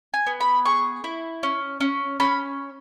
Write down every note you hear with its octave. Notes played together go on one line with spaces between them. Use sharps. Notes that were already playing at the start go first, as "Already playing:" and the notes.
G#5
B3
B5
G#4 C#6
E4
C#4
C#4
C#4 B5